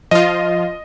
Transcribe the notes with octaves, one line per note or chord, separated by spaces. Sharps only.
F3 F4 D#5